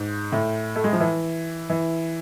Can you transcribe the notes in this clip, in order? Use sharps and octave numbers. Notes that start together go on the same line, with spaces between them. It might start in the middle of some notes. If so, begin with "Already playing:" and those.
Already playing: G#2
A2
A3
G#3
F3
E3
E3